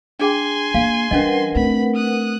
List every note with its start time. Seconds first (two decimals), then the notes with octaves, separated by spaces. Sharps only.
0.19 D4 G#4 G5 G#5 C6
0.75 A#3 F5
1.11 E3 G3 C#4 D4 A#4 B4 D#5 F#5
1.56 A3 C4 B5
1.96 D#6 F#6